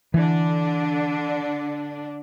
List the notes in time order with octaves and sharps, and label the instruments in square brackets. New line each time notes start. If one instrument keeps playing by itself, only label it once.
[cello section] D3 D4 [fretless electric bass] E3